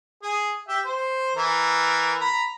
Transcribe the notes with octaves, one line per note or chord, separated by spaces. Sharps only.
G#4
G4 E5 G5
C5
E3 A#4
A#5 B5